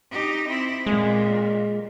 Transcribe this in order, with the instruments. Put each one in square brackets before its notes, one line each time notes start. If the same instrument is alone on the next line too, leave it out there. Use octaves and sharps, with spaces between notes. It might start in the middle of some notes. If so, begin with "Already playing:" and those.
[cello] D#4 G4
C4 E4
[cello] A#2 [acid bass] G#3